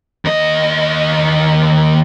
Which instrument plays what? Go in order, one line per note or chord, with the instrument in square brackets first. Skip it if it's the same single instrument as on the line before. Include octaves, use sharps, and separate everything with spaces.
[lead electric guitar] D#2 D#5